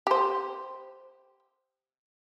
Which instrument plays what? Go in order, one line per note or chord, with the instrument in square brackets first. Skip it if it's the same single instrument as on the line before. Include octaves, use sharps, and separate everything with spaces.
[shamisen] G4 C5